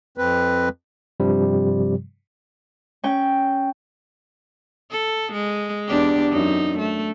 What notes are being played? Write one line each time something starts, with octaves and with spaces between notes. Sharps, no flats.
F2 C4 B4
G2 C3 F3 G3
C#4 G5
A4
G#3
E2 D4 G4
F#2 D#4
A3